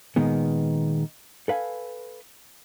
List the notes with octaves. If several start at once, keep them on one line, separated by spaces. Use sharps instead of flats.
A#2 D#3 G#3 B3
A4 B4 F5 G5 G#5